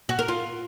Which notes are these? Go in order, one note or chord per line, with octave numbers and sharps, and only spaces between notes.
F#4
A#4
F4